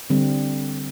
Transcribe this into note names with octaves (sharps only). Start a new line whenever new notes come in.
D3 G3 C4